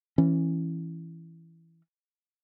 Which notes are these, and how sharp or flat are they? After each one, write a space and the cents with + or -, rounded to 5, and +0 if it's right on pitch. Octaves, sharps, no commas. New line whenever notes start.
E3 +0 C#4 -20